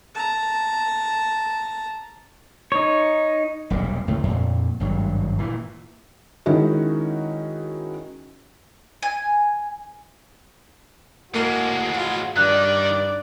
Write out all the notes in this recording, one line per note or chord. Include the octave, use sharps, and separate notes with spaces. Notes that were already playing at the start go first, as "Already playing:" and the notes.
A5 A#5
D#4 C#5
E1 B1 A#2 G3
C#2 A2 C3 A3
F2 A#2
G#1 G2 F#3
A#2 E3
D#3 G#3 C#4 D#4 E4 F#4
G#5
A2 G#3 A#3 F#4
F4
G2 D#3 D5 F#6